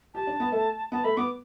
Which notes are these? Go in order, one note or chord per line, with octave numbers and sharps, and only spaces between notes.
G4 A5
D4
B3
A3
B3 A5
A3 B5
B3 D6